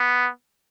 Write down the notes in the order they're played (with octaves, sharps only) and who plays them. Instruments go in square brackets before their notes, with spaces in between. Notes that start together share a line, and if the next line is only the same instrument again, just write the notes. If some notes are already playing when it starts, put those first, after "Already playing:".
Already playing: [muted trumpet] B3